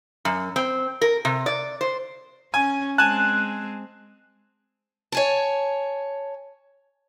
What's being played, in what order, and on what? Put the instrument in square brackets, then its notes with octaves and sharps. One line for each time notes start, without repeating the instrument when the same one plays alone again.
[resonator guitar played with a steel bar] F#2
C4
A#4
C3
D5
C5
[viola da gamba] C#4 [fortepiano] G#5
[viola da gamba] G#3 C4 [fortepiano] G#5 A5 [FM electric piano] F#6
[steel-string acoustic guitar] C#5 G#5 A5